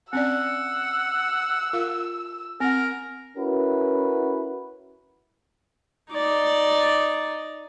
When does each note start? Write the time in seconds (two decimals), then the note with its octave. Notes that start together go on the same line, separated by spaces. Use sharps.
0.13 C4 C#4 D5 F#5 E6
1.73 F4 A#4 F5
2.60 C4 A#4 F#5
3.37 C#4 E4 F#4 A#4 B4
6.11 D#4 D5